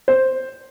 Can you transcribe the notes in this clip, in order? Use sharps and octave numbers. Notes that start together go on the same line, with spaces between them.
C5